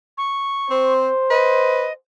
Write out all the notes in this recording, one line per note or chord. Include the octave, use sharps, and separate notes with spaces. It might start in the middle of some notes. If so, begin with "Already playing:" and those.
C#6
C4 C5
B4 D#5